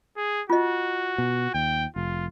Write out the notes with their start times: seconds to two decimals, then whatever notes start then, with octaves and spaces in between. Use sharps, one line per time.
0.17 G#4
0.50 F4 F#4 D#5
1.18 B2
1.54 D#2 G5
1.96 F1 F4